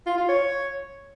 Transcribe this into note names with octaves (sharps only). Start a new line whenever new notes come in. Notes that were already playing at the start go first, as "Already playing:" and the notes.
F4
F4
C#5